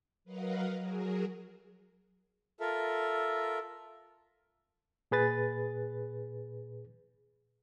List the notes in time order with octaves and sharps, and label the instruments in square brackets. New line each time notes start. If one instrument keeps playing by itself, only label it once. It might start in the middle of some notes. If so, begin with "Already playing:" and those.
[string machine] F#3 A#4 B4 D#5 F5 F#5
F#3 F#4 G#4 A#4
[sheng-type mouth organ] F4 A4 A#4 E5
[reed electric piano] A#2 G#4 B4 A6